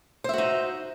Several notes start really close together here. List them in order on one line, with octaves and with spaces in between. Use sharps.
C5 E5 F#4 D#4